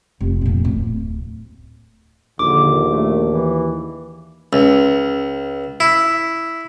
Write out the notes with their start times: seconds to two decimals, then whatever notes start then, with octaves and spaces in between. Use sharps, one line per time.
0.21 F1
0.41 F2 A#2
0.65 D1
2.39 A#1 D#2 D3 D6
2.85 A3
3.28 E3
4.53 C#2
5.80 E4